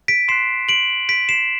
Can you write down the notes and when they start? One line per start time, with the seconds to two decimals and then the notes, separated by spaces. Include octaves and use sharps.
0.08 B6 D7
0.28 C6 F#6 C7 E7
0.69 D7 F#7
1.09 B6 D7
1.29 C7 E7